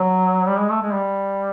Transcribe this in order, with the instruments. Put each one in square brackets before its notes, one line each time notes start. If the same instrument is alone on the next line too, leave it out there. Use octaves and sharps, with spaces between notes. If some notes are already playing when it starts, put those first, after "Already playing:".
Already playing: [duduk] F#3
G3
G#3
A3
G#3
G3